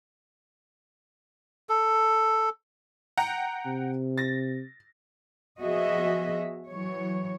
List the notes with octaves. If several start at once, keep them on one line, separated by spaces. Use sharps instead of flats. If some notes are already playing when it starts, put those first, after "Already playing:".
A4
F#5 G5 A#5
C3
A6 A#6
F3 B3 F#4 G#4 D#5 E5
E3 F#3 C#5